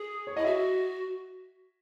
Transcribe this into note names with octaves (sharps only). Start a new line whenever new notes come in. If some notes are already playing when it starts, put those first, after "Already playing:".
Already playing: G#4
C#5
E4 D#5
F#4 E5